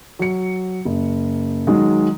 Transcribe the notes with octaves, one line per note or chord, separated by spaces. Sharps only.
F#3 C#7
F#1
D#3 F#3 G#3